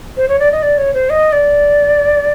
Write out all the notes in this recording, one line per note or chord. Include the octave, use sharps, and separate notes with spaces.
C5
C#5
D5
D#5
D5
C#5
C5
D#5
D5